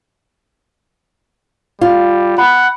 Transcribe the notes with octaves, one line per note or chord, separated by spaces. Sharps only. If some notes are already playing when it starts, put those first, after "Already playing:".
G3 F4
F#5 B5